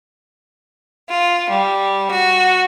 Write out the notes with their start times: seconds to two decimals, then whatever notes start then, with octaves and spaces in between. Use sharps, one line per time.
1.08 F4
1.49 G3
2.11 F#4